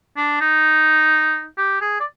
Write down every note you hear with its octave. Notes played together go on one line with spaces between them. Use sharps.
D4
D#4
G4
G#4
D5